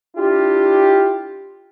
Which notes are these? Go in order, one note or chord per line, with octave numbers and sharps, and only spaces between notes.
D4 E4 F4 G4